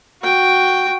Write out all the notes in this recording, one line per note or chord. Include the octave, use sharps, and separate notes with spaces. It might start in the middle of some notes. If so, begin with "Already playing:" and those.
F#4 G5